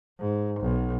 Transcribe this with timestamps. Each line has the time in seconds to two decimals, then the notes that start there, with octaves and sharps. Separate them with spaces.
0.20 G#2
0.61 B1